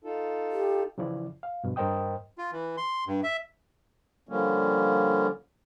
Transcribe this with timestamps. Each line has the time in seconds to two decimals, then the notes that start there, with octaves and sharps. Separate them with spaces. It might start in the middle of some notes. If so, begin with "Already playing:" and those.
0.04 D#4 F4 A4
0.52 G4
0.98 C#3 E3 F3 E4 D5
1.43 F5
1.64 G2 B2 F3
1.76 G2 A#4 C5 D#5 G5 D#6
2.38 F4
2.52 E3
2.77 C6
3.07 G2
3.24 E5
4.29 D3 F3 G3 A#3 C#4